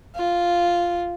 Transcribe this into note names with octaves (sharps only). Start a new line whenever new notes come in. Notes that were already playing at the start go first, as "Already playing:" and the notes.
F4